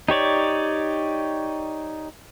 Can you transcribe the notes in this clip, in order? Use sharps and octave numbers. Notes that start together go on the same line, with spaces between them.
D#4 G4 C#5 D5